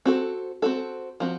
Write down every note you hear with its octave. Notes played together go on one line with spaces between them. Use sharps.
C4 F#4 A4
C4 F#4 A4
F3 C4 F#4